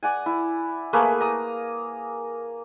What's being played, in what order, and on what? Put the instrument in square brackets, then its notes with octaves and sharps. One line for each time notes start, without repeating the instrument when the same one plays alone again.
[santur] D5 F#5 G#5
E4
A3 A#3 G#4 B4
A#5 D#6